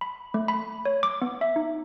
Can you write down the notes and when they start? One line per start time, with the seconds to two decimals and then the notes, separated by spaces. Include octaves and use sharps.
0.01 B5
0.34 A3
0.48 B5
0.85 C#5
1.03 D6
1.22 B3
1.41 E5
1.56 D#4